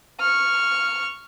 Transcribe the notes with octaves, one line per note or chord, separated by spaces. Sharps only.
C#6 F6